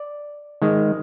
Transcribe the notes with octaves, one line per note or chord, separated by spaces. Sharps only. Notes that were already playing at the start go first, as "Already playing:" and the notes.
Already playing: D5
D#3 G#3